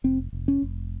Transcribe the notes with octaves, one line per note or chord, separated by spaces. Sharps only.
F1 C4
F1
C#4
F1